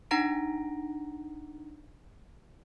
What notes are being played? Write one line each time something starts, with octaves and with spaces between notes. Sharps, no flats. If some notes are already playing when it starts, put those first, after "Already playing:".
D4 D#4 F#5 A#5 A#6 D7